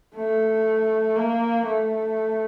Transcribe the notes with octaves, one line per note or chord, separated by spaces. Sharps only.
A3
A#3
A3